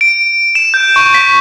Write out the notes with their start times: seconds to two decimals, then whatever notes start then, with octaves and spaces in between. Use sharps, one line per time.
0.01 D7
0.55 E7
0.74 G6
0.96 C#6
1.14 B6